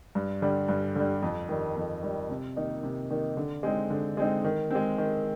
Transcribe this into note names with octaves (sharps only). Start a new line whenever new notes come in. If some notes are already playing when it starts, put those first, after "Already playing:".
G2
D3 G3
G2
D3 G3
F2
D#3 G3
F2
D#3 G3
C3
D#3 A#3 D#4
C3
D#3 A#3 D#4
D3
G#3 C4 D#4
D3
G#3 C4 D#4
D#3
G#3 C4
D#3